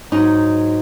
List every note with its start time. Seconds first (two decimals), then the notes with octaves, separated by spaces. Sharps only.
0.12 G#2 F#3 D#4